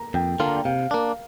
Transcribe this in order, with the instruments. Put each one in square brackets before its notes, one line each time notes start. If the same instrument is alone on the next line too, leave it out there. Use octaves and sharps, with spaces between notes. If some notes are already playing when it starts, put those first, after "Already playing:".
Already playing: [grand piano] A#5
[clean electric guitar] F2 [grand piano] G5
[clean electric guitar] D3 A#3 D4 F4
[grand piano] A#5
G5
[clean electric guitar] C3 [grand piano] F5
[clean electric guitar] A#3 D4 [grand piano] A#4